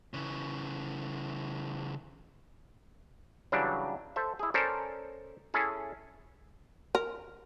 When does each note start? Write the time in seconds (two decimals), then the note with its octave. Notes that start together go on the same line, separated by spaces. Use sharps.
0.14 C#3 E3
3.52 C#3 E3 F#3 G3 D4
4.16 A4 C5 E5
4.39 E4 G#4
4.54 C#4 A4 A#4 C5 D5
5.54 C#4 E4 G#4 A4
6.95 A#4